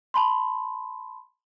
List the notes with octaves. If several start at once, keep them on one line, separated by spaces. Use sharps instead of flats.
A5 B5 C6